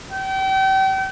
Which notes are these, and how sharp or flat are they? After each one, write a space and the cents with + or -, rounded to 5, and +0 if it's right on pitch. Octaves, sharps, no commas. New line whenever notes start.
G5 -35